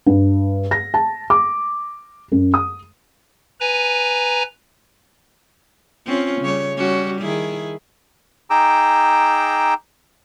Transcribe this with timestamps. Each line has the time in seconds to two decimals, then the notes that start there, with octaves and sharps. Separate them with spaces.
0.06 G2
0.71 A#6
0.94 A5
1.30 D6
2.32 F#2
2.54 D#6
3.60 B4 G#5 A#5
6.06 C4 C#4 F4
6.41 C#3 G3 C#5
6.76 G3 C#4 F#4
7.21 D#3 E4 G#4
8.50 D#4 G#4 G5 A#5 D6 E6